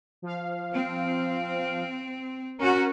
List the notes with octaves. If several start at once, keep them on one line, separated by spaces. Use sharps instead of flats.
F3 F5
C4
C#4 F#4 A#4